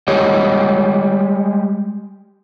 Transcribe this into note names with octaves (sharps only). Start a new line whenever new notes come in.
G3 G#3 G4 C#5 D#5